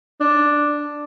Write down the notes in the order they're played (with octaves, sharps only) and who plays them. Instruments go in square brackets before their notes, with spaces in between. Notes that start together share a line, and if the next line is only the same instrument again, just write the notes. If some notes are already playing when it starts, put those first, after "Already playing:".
[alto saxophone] D4